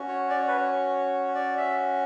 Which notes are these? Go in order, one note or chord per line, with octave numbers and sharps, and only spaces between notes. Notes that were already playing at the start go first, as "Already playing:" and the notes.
Already playing: C#4 F#4
C#5
D5
C#5
B4
C#5
D5
E5